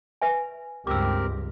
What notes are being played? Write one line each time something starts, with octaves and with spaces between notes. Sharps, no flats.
B4 E5 G#5
C#2 G2 C4 G4 A#4 D6 E6